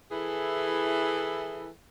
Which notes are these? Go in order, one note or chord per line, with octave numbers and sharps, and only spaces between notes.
E3 E4 G#4 A4